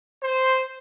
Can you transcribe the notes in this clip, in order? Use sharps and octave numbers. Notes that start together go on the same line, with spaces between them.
C5